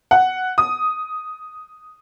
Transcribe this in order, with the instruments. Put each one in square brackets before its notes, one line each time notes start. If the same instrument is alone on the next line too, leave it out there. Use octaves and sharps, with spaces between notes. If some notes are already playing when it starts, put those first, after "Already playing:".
[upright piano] F#5
D#6